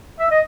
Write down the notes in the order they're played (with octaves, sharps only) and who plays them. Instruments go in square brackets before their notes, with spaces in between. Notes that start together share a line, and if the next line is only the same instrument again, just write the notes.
[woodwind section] E5
D#5